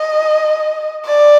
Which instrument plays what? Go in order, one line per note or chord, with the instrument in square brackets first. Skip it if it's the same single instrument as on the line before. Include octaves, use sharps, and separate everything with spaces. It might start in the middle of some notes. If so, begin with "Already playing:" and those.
Already playing: [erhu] D#5
D5